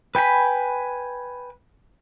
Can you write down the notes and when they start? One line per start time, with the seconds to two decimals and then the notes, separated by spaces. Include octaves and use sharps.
0.15 B4 G5 G#5 B5